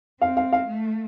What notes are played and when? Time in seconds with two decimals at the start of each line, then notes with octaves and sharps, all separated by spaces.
0.20 C4 F5
0.37 F5
0.53 F5
0.67 A3